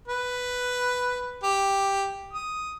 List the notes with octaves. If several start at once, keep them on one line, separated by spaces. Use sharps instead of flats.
B4
G4
D#6